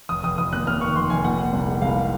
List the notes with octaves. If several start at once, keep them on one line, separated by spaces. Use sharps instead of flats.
F1 D#6
F1 D#6
F1 D#6
D#2 F#6
D#2 F6
D#3 C#6
F1 C6
F1 G#5
A#2 F#5
A#2
C2
G#3
C2 F5
G#3